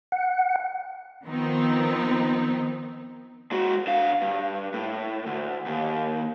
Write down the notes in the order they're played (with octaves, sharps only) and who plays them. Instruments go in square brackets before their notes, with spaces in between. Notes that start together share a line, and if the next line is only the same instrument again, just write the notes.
[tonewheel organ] F#5
[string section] D#3 F3 B3 C4 D#4
[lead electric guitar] G#3 F#4
D3 F5
G2
A2
D2
D#2